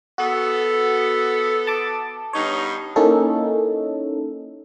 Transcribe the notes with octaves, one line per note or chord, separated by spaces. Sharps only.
B3 F#4 A4
A5 D6
G2 B3 D#4 C#5
A#3 C#4 D#4 E4 A4